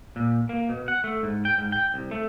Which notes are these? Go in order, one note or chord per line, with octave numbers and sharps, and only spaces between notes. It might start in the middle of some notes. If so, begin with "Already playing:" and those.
A#2
A#3
B2
F#5
A3
G#2
G5
G#2
G5
C2
A3